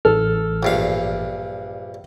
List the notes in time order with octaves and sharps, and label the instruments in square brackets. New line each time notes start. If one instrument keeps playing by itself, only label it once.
[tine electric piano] A1 F6 [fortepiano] A4
[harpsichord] A#1 G2 F5